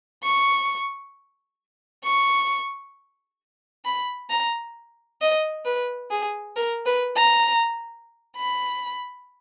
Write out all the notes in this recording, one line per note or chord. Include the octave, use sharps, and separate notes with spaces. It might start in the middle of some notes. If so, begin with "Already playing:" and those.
C#6
C#6
B5
A#5
D#5
B4
G#4
A#4
B4
A#5
B5